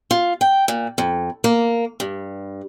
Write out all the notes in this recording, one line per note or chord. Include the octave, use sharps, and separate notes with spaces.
F4
G5
A#2
F2
A#3
G2